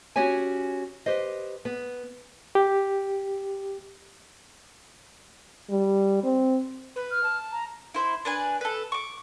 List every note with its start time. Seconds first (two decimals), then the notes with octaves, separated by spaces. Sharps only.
0.16 C#4 F#4 G4 C#5 G#5
1.06 G4 B4 C5 D#5
1.65 B3
2.55 G4
5.70 G3
6.24 C4
6.96 B4
7.11 F6
7.23 A5
7.52 A#5
7.94 E4 C5
8.25 D4 B4 G#5
8.61 A4 B4
8.92 C#6 D6